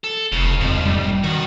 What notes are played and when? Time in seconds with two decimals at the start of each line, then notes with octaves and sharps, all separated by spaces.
0.04 A4
0.32 F1 C#3
0.61 C2 F2 G#2
0.85 G3
1.24 F#2 D#3 F#4